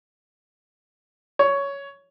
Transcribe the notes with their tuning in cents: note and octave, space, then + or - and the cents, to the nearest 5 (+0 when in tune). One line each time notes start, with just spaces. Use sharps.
C#5 +10